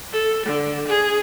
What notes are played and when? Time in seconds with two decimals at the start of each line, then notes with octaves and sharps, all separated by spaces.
0.13 A4
0.46 D3
0.87 G#4